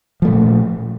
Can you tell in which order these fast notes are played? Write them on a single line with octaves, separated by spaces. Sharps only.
F3 A3 A#2